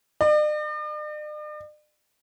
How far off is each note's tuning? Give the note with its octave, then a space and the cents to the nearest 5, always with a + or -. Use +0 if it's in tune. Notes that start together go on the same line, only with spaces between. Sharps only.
D5 +45